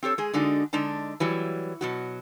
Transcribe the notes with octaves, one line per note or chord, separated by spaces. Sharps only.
C4 G4 A4 C#5
G#3 G#4
D3 G#3 D4 D#4 F#4
D3 G#3 D4 D#4 A5
E3 F#3 G3
B2 F#3 F#4